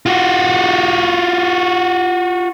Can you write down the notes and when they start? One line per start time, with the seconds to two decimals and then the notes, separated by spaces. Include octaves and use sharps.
0.06 F4 F#4